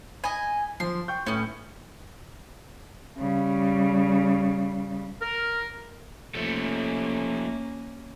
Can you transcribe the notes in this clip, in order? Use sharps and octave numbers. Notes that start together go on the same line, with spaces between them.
D#5 G#5 B5
F3 C6
G5 C#6 G6
A2 B3 C#4
C#3 G3
A#4
F3 A3 A#3 C#4